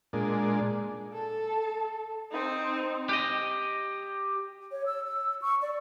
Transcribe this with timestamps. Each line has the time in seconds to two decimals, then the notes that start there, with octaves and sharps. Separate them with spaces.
0.13 A#2 G#3 D4
1.13 A4
2.31 C4 D#4
3.09 G4 D#5
4.72 C#5
4.86 E6
5.04 E6
5.42 C#6
5.62 D5